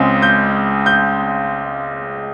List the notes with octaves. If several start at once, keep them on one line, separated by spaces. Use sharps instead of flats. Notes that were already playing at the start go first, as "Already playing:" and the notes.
Already playing: C#2 C#3 G#3 C4
G6
G6